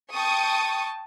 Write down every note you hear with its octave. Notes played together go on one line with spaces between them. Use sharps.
G5 A5 C#6 D#6